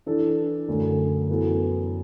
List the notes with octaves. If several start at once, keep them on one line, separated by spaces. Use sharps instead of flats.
E3 D4 A4
F#2 D3 A3
F#2 E3 B3 F#4 A4